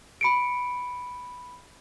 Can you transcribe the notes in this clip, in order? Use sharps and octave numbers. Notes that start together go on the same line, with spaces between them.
B5 C#7 D7